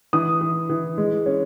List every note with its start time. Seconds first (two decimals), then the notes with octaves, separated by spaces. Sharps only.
0.13 E3 D#6
0.41 E3
0.70 E3
0.98 G#3
1.26 C#4